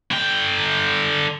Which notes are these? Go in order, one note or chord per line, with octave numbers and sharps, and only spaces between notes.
D3 G5